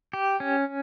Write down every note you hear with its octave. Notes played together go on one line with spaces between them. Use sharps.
G4
C#4